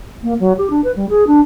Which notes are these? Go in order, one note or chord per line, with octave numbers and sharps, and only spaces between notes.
A#3
F#3
G4
D4
B4
G3
G#4
D4